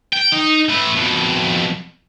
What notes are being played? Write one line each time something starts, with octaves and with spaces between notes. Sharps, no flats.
G5
D#4
A3 B4
F2 B2